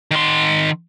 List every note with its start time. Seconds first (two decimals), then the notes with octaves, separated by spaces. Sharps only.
0.11 D#3 C6